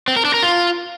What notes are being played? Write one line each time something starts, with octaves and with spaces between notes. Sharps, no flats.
C4
A#4
D4
A#4
F4